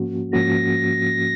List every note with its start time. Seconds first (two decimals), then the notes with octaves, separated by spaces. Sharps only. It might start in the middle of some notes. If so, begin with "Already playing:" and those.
Already playing: G#2 F3 A#3 C#4 F#4
0.33 G#2 F3 A#3 C#4 F#4 A#6